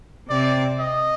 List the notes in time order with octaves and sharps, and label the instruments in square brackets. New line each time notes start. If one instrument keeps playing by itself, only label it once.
[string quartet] C3 C4 [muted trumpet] D5
[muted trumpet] D#5